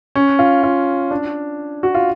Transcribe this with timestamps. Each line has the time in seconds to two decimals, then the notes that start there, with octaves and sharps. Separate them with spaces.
0.15 C#4
0.39 F4
0.63 F4
1.11 D4
1.83 F#4
1.95 F4